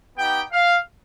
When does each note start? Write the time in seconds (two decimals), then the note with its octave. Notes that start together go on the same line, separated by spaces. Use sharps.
0.18 B3 D#4 G4 G5
0.53 F5